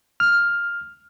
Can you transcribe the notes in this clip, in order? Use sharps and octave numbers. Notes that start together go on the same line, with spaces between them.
F6